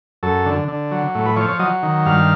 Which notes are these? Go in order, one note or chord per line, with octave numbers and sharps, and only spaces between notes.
F#2 A4
D3
D3
F#3
A2
B4
F3 C#5
C#5
F#3 D#5
D#3
G2 F5